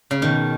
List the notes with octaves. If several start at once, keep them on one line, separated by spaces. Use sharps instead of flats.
C#3
B2 D#3